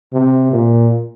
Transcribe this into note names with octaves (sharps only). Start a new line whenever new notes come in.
C3
A#2